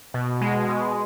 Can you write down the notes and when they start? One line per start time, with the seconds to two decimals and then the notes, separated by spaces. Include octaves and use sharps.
0.14 B2
0.41 G#3
0.69 B2